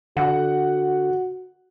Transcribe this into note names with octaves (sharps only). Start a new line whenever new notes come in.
D3 F#4 F#5